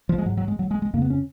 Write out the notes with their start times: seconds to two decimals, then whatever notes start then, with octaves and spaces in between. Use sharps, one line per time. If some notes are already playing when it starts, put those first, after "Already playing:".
0.09 F3
0.18 G#3
0.26 G#2 F#3
0.37 F#3
0.48 G#3
0.59 F#3
0.71 G#3
0.82 G#3
0.93 F2 C#3 A#3
1.02 B3
1.10 C#4